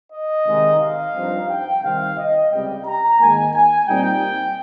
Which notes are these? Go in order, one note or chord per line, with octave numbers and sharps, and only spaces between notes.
D#5
C3 D#3 G#3 D#4
F5
G2 F3 C4 D#4
G5
C3 D#3 G3 C4 F5
D#5
C#2 C3 G3 G5
A#5
G#2 D#3 A#3 G#5
G#5
A#2 G3 C4 D#4 G5